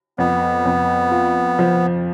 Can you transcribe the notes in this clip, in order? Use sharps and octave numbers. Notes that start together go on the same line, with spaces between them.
F2 B3
F2
F4
F3